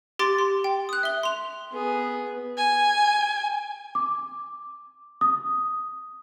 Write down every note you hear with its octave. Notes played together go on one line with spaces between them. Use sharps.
G4 C6 D6 A6 D7
C6
G5
D#6 F#6
E5 G7
C6 F7
B3 G#4
G#5
D6
D#6